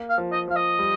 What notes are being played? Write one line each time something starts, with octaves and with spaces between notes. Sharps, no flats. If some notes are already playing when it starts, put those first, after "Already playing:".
Already playing: A#3
F5
F3
D#5
F3 F5
D#5
G3